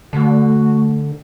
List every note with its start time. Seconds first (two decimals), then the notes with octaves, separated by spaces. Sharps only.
0.13 D3 A3 F#4